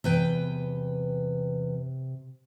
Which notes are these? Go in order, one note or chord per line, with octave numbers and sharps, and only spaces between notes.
E2 C3 B4 G5